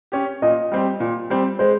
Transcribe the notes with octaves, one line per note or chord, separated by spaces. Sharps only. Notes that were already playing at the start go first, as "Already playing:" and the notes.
C#4 G4
A#2 D#5
G3 C4 G4
A#2
G3 C4 G4
G#3 C5